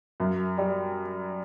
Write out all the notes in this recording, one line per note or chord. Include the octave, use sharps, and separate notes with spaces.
F#2
G3